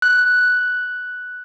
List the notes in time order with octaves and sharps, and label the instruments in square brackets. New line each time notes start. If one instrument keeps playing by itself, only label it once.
[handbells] F#6